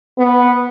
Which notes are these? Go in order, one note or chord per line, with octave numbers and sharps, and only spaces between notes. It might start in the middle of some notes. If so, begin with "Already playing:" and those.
B3